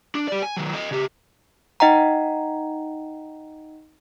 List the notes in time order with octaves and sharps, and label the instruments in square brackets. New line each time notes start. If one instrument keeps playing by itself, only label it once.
[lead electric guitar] D4
G4 D5
G#5
D#3 F#3
A4 D#5
C#3 G4
[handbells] D#4 D#5 F#5 G5 A#5